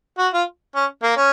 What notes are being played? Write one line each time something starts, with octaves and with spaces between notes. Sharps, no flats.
F#4
F4
C#4
A#3
C#4